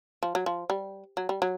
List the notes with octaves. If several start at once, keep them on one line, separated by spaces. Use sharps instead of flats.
F3
F#3
F3
G3
F#3
G3
F#3